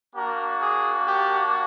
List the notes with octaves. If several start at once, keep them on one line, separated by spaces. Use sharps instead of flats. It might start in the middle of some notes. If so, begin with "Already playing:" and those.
A#3 D4 F#4 A#4
G#4
G4